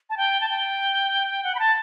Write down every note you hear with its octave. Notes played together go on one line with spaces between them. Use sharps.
A5
G5
A5
G5
F#5
B5
A5